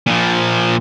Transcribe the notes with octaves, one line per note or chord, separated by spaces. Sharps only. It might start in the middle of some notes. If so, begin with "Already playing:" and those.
A#2 F3